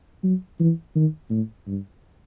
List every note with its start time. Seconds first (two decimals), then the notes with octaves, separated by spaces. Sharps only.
0.23 F#3
0.59 E3
0.95 D#3
1.30 A2
1.67 G2